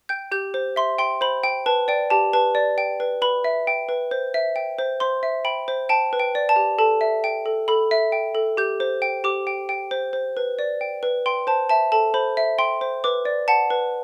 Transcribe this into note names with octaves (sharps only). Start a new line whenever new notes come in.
G5 G6
G4 G6
C5
E5 C6
G5 C6
C5 B5
G5
B4 A5
D5 G5
G4 A5
B4 A5
D5
G5
B4
B4 B5
E5
G5
B4
C5
E5
G5
C5
C5 C6
E5
G5 B5
C5
G5 A5
B4
G5
D5
A5
G4
A4 A5
E5
G5
A4
A4 B5
E5
G5
A4
G4 G6
C5
G5
G4 D6
G5
G5
C5
C5
B4
D5
G5
B4
G5 C6
C5 A5
E5 A5
A4 A5
C5 B5
E5
G5 C6
C5
B4 D6
D5
F#5 A5
B4